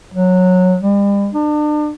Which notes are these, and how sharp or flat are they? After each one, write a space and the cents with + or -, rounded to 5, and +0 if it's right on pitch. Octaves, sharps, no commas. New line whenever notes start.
F#3 -15
G3 +40
D4 +35